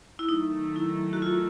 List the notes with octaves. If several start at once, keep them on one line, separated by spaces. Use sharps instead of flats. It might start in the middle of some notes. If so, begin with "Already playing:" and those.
E4
D#3 F#3 A3 D#4
E4
F#4
F4